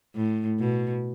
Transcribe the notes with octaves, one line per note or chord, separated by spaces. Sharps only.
A2
B2